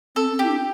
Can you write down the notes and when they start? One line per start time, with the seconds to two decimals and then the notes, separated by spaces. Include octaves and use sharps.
0.15 C4 A4
0.32 C4
0.39 E4 G4
0.49 D4